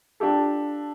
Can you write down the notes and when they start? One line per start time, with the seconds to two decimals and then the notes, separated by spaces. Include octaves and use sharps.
0.20 D4 F4 G4 A4